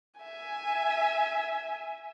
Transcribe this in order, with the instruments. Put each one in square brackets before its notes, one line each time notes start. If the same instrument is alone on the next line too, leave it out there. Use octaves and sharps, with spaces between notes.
[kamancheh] E5 G#5